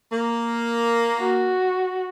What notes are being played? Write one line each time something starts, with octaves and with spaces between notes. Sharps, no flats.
A#3
F#4